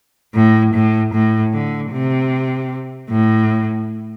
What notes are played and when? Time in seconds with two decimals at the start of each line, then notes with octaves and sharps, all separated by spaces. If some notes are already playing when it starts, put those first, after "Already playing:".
0.35 A2
0.74 A2
1.13 A2
1.53 D3
1.92 C3
3.10 A2